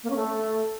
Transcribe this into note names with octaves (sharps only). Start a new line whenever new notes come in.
A#3
C#4
A3